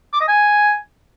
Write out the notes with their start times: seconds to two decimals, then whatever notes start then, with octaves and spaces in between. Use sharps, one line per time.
0.13 D6
0.21 D#5
0.28 G#5